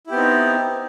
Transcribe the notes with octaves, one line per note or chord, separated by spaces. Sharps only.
B3 C4 D#4 E4 G4